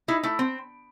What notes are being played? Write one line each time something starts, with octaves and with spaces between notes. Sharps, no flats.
D#4 E4
A3 E4
C4